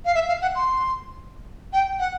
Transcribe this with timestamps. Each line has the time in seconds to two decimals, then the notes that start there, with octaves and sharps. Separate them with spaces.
0.05 F5
0.15 E5
0.28 F5
0.42 F#5
0.55 C6
1.73 G5
1.99 F#5